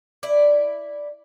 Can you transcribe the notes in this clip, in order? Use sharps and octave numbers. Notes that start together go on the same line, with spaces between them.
E4 D5